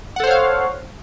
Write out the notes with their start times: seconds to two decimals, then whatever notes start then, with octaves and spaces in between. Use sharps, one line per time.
0.16 F#5
0.20 A4
0.23 C5
0.27 C#5
0.31 F5